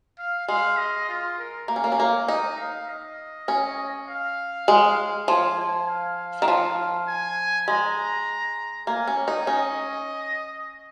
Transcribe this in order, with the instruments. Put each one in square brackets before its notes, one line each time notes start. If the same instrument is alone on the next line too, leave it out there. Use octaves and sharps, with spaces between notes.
[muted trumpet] F5
[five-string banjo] G#3 [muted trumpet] F5
[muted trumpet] D#5
F4
A#4
[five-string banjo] A#3
C#4
A#3
C#4
A#3
[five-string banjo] D#4 [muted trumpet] D#5
[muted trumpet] F5
D#5
[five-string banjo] C#4
[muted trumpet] F5
[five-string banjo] G#3
[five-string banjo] F3 [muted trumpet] G#5
[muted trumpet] G#5
F5
[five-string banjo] D#3
F3
[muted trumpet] G#5
[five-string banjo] G#3 [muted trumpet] A#5
[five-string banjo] A#3 [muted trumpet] G#5
[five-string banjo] C#4
D#4
[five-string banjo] C#4 [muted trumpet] D#5